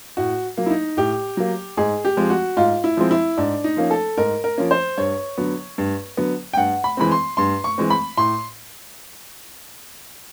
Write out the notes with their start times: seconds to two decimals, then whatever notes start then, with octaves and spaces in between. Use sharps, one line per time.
0.17 A2 F#4
0.57 F#3 A#3
0.66 E4
0.70 D#4
0.97 A2 G4
1.37 F#3 A#3
1.77 G#2 G#4
2.05 G4
2.17 F3 G#3 C4
2.30 F#4
2.57 G#2 F4
2.84 E4
2.97 F3 G#3 C4
3.11 E4
3.37 G#2 D4
3.64 D#4
3.77 F3 A#3 C#4
3.91 A4
4.17 G#2 A#4
4.44 A#4
4.58 F3 A#3 C#4
4.71 C5
4.97 G2 C#5
5.38 D3 F#3 B3
5.78 G2
6.17 D3 F#3 B3
6.53 G5
6.57 G2 F#5
6.84 B5
6.97 E3 G#3 C4 B5
7.12 C6
7.37 G2 C6
7.64 C#6
7.78 E3 G#3 C4
7.90 B5
8.18 A2 C6